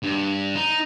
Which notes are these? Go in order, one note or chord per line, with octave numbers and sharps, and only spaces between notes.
G2
D#4